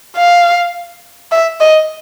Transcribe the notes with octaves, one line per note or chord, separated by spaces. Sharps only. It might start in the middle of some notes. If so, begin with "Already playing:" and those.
F5
E5
D#5